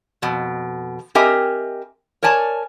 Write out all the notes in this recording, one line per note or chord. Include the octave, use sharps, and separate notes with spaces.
F2 B2
C4 G4 A#4 D#5 E5 G#5
A#4 C#5 D5 G#5 A5